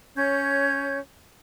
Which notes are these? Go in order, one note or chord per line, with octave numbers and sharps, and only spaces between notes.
C#4 C#5 G6 G#6